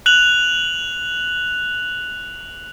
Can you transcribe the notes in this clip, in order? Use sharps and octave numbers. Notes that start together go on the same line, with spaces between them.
F#6 F7 F#7